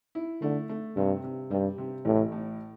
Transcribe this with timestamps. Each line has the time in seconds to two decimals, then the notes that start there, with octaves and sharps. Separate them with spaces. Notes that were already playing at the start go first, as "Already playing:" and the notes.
0.15 E4
0.41 D3 A3
0.69 A3
0.96 G2 C3
1.24 C3
1.51 G2 G3
1.78 C3
2.05 A1 A2
2.32 A2